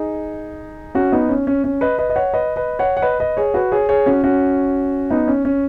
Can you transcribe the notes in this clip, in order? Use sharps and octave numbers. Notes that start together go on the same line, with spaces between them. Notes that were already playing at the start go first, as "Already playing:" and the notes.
Already playing: D#4 G#4
C#4 F#4
B3 D#4
C#4
C#4
C#4
B4 D#5
B4 D#5
D#5
C#5 F#5
B4 D#5
B4 D#5
C#5 F#5
F#5
B4 D#5
B4 D#5
G#4 C#5
F#4 B4
G#4 C#5
G#4 C#5
C#4 F#4
C#4 F#4
B3 D#4
C#4
C#4